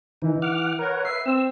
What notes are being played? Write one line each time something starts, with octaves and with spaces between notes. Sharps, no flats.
D#3 E3 D#4
F#5 D6 F6
A#4 B4 C#5 F#5
B4 E5 C7
C4 E6